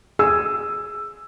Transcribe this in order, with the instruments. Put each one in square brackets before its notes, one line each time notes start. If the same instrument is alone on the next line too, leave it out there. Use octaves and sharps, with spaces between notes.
[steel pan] G#4 [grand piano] E6